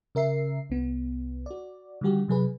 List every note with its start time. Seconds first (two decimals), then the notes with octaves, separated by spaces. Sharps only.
0.15 C#3 A#4 E5 C7
0.70 C2 B3
1.46 F#4 D5
2.01 D3 D#3 G3 F#4 G4
2.28 C3 F#3 G#4 B4